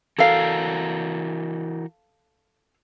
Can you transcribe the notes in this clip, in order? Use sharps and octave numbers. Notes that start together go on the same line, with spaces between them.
E3 F#4 A4 A#4 F5